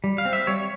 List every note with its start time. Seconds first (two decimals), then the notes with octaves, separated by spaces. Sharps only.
0.04 G3
0.18 F5
0.25 C4
0.33 E5
0.47 G3 C#5